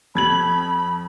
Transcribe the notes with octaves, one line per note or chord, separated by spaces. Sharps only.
F2 B5 G#6 F#7